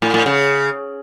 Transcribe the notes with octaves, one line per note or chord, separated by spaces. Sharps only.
A2
A2
C#3